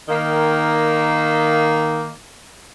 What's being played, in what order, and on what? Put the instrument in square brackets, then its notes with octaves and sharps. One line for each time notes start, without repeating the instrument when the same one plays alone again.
[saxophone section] D#3 A#3